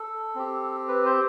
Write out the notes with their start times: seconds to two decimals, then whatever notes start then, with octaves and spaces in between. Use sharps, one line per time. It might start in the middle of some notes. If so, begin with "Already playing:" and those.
Already playing: A4
0.35 C4 G4
0.88 B4
1.05 C5